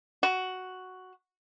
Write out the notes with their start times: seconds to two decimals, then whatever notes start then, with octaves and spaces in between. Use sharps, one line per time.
0.23 F#4